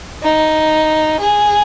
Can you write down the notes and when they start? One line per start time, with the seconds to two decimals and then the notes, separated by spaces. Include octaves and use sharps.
0.23 D#4
1.20 G#4